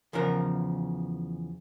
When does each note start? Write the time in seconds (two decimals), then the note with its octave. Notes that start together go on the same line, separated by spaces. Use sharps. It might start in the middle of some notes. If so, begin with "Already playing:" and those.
0.13 E2 C#3 F3 A#4 F#5